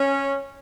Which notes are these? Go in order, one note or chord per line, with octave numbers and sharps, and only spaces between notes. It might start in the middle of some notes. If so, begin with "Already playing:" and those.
Already playing: C#4